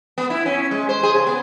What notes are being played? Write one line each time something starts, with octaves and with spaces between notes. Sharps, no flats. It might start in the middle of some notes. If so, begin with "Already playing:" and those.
B3
E4
C#4
G#3
C5
G#4
C#3
B3